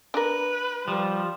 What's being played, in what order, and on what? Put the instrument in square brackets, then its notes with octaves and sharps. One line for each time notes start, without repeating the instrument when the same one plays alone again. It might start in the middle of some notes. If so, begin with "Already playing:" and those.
[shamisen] D4 A#4 [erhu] B4
[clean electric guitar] F3 [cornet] G3